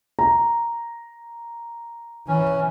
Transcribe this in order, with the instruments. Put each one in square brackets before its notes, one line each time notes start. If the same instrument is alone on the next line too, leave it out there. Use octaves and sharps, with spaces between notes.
[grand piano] A#5
[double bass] E3 [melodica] C#4